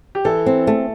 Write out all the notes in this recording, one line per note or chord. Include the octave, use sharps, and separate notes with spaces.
G4
E3 A4
C4
A3 A4